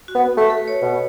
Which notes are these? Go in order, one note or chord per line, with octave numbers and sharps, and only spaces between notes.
F#4
B3
A3 B4
A4
B4
C#5
B2